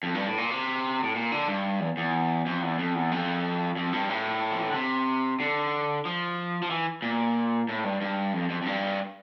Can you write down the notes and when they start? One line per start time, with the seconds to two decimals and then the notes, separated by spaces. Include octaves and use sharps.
0.03 F2
0.14 G2
0.26 A2
0.38 A#2
0.50 C3
1.03 A2
1.15 A#2
1.32 D3
1.49 G2
1.80 E2
1.97 E2
2.46 F2
2.62 E2
2.78 F2
2.95 E2
3.11 F2
3.76 F2
3.93 G2
4.09 A2
4.51 F3
4.59 E3
4.67 D3
4.74 C3
5.40 D3
6.05 F3
6.62 F3
6.71 E3
7.02 A#2
7.69 A2
7.84 G2
8.01 G2
8.33 F2
8.50 F2
8.62 F2
8.66 G2